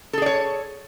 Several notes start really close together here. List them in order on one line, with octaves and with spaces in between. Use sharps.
A4 G#4 D5 C#5